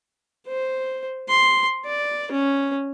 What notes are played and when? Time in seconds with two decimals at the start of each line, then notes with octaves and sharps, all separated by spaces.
0.47 C5
1.29 C6
1.85 D5
2.32 C#4